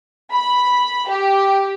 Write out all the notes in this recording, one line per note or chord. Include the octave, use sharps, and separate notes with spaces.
B5
G4